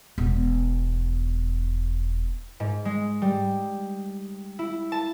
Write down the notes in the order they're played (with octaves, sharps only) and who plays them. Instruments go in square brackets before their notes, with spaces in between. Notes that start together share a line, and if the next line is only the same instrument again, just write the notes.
[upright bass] E1 B3
[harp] G#2
G#3
G3
E4
A5